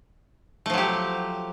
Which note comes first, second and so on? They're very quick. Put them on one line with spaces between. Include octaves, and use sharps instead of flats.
A3 F3 F#3 G4